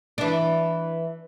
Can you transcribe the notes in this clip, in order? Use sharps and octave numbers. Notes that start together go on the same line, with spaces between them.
E3 D4